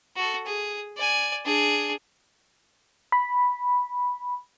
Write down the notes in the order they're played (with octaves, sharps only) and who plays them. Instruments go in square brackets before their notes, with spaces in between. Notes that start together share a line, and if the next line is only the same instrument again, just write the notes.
[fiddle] F#4 A4
G#4
D5 G#5
D4 G#4
[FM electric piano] B5